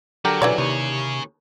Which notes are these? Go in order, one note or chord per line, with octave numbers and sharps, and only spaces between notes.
D3 F#3 G4 A#4
B2 E3 C#4 D5
D#2 C3 G#4 C#5